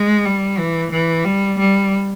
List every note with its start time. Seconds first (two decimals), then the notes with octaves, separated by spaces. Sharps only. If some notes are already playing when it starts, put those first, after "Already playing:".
Already playing: G#3
0.25 G3
0.58 E3
0.91 E3
1.25 G3
1.58 G3